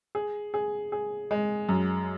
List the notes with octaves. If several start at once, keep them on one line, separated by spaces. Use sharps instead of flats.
G#4
G#4
G#4
G#3
F#2